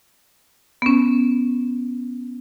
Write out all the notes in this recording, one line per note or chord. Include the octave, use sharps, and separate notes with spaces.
B3 C#4